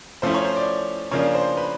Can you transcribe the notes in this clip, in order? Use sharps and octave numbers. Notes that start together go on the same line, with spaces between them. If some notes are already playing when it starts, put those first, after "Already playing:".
F3 A3 C#4 E4 C5
C#5
C5
D5
C#3 F3 A#3 D4 C#5
C5
B4